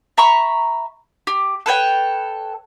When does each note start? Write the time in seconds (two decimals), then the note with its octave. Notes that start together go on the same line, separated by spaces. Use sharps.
0.17 E5 A#5 B5 C#6
1.27 G4
1.66 A4 B4 C#5 G5